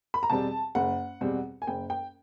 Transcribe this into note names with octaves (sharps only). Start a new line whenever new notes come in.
B5
A#5
E2 B2 G3 C4 A5
F#1 F#5
E2 B2 G3 C4
G#5
F#1 G5
G5